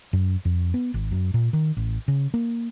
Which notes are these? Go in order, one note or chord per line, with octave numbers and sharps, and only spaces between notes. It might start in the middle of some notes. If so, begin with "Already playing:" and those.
F#2
F2
B3
G#1
F#2
A#2
D#3
A1
C#3
A#3